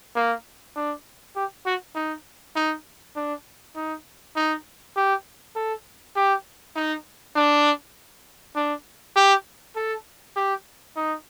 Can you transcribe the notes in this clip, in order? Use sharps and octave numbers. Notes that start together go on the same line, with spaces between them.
A#3
D4
G4
F#4
D#4
D#4
D4
D#4
D#4
G4
A4
G4
D#4
D4
D4
G4
A4
G4
D#4